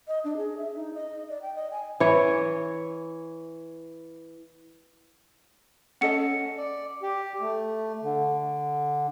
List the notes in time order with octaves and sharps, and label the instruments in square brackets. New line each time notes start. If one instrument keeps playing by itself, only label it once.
[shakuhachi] D#5
D4
G#4
E5
D#4
D#5
D5
G5
D#5
G#5
[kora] E3 C#5
[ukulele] C#4 A4 D#5 [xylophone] F#5 C#7
[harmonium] D5
G4
A3
D3